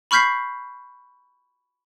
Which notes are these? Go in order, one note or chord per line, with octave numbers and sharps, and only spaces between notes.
B5 C#6 F6 G6 B6 C7